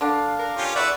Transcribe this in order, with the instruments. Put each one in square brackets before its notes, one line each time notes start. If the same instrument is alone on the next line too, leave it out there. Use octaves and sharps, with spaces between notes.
[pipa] D3 D4 [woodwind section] F5
[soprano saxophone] A#4
[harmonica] C#4 F4 G4
[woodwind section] E2 A4 C#6 [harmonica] B4 E5 F#5 [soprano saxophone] D5